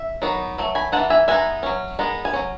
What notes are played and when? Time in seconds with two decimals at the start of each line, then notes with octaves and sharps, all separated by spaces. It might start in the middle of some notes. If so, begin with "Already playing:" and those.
Already playing: E5
0.22 D#3 F#3 B3 D#4
0.58 F#3 A3
0.75 G#5 B5
0.92 E3 G#3 D#4 F#5 A5
1.10 E5 G#5
1.28 G#3 B3 D#4 E5 G#5
1.63 F#3 C#4
1.99 D#3 G#3 B3 D#4
2.25 G#5
2.33 F#3 C#4